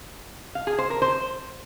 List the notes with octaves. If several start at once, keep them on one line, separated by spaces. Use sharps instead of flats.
F5
G#4
C5
A#4
C5